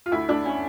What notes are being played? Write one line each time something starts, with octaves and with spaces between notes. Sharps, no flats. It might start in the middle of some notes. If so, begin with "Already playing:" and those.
F4
D2 E4
D2 D4
C#4